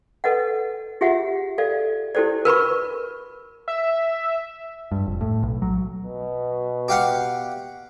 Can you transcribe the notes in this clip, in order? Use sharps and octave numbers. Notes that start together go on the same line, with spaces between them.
A4 B4 D#5 F#5
F4 G4 G#4 E5 F#5
A4 D5 F5
E4 G4 A4 C5 D5
A#4 B4 B5 C#6
E5
G2
F1
A2
B1
F#3
B2
G4 F5 F#5